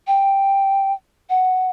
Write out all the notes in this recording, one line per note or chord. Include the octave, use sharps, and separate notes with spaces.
G5
F#5